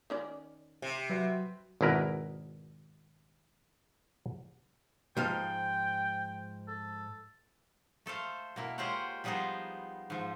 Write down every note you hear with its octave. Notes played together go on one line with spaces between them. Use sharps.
D#3 C#4 D5
C3
F#3 F#4 B4 E5
G#1 B2 E4 A#4 B4
G#2 F3 F5 G5
A4
A3 A4 C5 F5
B2 A#3 E4
G#3 F4 G4 C5 C#5 F#5
F3 G3 B3 D#4 G#4 C5
G#2 F3